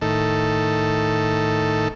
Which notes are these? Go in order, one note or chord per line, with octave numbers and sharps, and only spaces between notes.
A2 D#3 A4